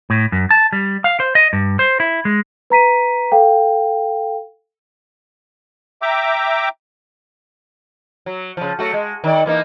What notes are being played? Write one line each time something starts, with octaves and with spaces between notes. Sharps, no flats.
A2
F#2
A5
G3
F5
C5
D#5
G2
C5
E4
G#3
B4 A#5 B6 D#7
A4 F5 G5
E5 G5 A#5 D6
F#3
C#3 F3
F#3 A3 F#4
G#3
D#3 D5
E3 A#3 D#4